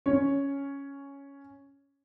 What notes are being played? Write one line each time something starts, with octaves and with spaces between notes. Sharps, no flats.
C#4 C#5